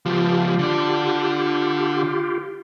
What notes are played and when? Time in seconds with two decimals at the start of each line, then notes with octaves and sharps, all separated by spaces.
0.06 C#2 F3 F4 G4
0.59 D3 D4